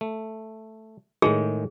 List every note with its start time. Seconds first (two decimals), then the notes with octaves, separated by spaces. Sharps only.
0.01 A3
1.22 A2 D#3 G#3 G#4